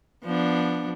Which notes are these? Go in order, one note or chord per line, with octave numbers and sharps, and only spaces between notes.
F3 B3 D4